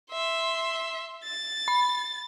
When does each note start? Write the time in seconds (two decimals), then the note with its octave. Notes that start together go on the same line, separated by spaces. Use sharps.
0.11 E5 C6
1.24 A6
1.68 B5